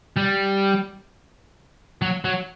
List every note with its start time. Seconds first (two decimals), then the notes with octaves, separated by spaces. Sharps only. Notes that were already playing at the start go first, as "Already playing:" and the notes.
0.17 G3
2.02 F#3
2.25 F#3